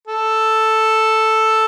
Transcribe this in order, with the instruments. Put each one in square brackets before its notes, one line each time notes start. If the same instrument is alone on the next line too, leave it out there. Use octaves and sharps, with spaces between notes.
[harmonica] A4